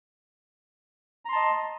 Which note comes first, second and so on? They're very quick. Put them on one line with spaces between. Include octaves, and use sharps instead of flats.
A#5 C6 A5 D#5